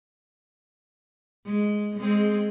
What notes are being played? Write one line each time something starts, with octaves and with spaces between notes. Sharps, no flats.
G#3
G#3 C4 G#4